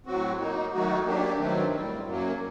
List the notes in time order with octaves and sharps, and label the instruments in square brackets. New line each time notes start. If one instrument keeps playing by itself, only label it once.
[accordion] A2 F#3 C4 F#4
F#3 A#3 D#4
D#3 F#3 A3 D#4 F#4
F#3 A#3 D4 G4
G2 D#3 F#3 A3 C4
A2 G3 C4
F#2 F#3 A#3